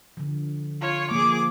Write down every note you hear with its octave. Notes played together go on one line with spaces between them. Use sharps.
D3 F3
F4 C#5
F3 A#3 G#4 D6